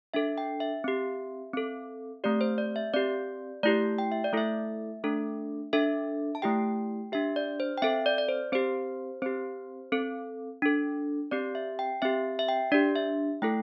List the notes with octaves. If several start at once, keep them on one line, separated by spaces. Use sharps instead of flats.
D4 A4 E5
G5
E5
C4 G4
C4 A4
A3 C4 G4 D5
C5
D5
E5
C4 G4 D5
A3 E4 G4 D5
G5
E5
D5
A3 E4 A4 E5
A3 D4 A4
D4 A4 E5
A5
A3 E4 G4 G5
D4 G4 E5
D5
C5
G5
C4 A4 E5
D5
D5
C5
C4 G4 C5
C4 G4 C5
C4 A4
D4 A4
C4 G4 D5
E5
G5
C4 G4 E5
E5
G5
D4 G4 D5
E5
A3 E4 A4 G5